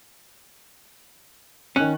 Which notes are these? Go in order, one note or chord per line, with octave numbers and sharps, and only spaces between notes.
D#3 C#4 F#6